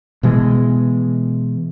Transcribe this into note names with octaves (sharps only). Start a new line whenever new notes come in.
B2 E3 G#3